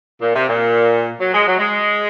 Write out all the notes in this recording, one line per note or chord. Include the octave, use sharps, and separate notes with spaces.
A#2
C3
A#2
F#3
G#3
F#3
G#3